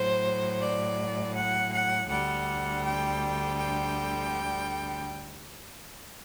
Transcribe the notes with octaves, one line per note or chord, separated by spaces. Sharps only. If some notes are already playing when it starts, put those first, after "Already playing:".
Already playing: A2 F#3 C5
D5
F#5
F#5
D2 D3 G3 F#5
G5
G5